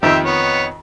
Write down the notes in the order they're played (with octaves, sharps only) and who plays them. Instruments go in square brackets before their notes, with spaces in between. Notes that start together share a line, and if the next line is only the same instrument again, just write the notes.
[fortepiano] F2 D#3 [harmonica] C4 G4 E5
[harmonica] B3 C#5